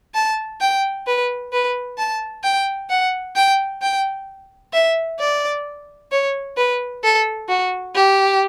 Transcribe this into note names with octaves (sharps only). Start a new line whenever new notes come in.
A5
G5
B4
B4
A5
G5
F#5
G5
G5
E5
D5
C#5
B4
A4
F#4
G4